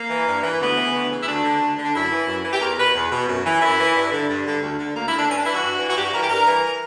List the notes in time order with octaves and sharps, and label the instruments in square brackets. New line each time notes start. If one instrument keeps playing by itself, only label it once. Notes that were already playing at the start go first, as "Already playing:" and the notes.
Already playing: [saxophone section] A#3
E3
G2
E3
D2 B3
C#3 E3
D2
C#3 E3
E4
D2 D4
D3
D2
D3
D4
F#2 E4
E3
F#2
E3
G4
E2 A#4
B2 B4
E2
B2
F#2
E3
F#2 E4
E3
G2
D3
G2
D3
D2
D3
D2 A#3
E4
D3
D4
G2 C#4
D4
E3 E4
F#4
G2
E3
F#4
G2 G4
F#4
E3 A#4
G4
G2 A#4
E3